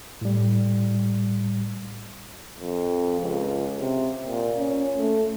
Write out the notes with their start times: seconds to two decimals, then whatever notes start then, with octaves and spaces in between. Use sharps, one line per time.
0.21 A2 G3
2.60 F2
3.21 C#2
3.79 C3
4.26 A#2
4.58 C#4
4.97 A3